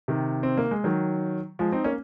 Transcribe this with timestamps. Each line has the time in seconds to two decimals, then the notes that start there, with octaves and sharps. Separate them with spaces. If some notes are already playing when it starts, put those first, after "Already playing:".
0.08 C3 D#3
0.43 C4
0.57 A#3
0.71 G#3
0.84 D#3 F#3
1.59 F3 G#3
1.72 C4 D#4
1.84 A#3 C#4